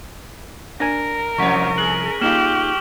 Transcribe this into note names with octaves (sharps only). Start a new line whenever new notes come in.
D4 A#4 G#5 A#6
C2 F2 F3 C#5 C#6 B6
G#4 F#6 F#7
A#3 D#4 F4 G4 F6 E7 F#7